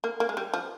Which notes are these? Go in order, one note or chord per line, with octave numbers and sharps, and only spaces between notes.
A#3
A#3
G#3
G3
F3